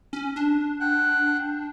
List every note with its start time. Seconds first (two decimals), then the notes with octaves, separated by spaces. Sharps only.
0.13 C#4
0.36 D4
0.80 F#5 G5 F#6